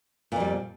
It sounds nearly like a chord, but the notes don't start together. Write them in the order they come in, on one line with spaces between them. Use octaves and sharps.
A#2 F2 G3